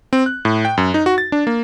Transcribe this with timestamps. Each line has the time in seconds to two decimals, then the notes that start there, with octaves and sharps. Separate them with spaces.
0.13 C4
0.26 F#6
0.45 A2
0.65 G5
0.77 F#2
0.94 D#4
1.06 F#4
1.18 A6
1.32 D4
1.47 A#3